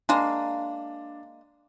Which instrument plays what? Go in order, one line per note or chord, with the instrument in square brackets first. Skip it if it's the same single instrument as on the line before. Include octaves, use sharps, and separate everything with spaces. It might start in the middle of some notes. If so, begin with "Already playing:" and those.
[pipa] G#3 A#3 [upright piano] D4